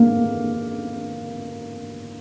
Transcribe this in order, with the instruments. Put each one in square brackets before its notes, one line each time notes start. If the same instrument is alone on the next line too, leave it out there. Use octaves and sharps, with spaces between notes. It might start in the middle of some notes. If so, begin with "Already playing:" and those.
Already playing: [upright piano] A#3